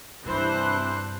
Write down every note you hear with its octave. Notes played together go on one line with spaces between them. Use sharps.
G2 C3 E3 D4 C5 F#6